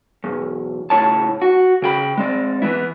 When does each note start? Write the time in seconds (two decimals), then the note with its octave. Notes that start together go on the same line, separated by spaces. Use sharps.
0.24 B1 E2
0.90 C#2 A2 E4 C#5 A5
1.42 F#4
1.82 C#3 G5 B5
2.17 G#3 C4 D5
2.62 E3 B3 E4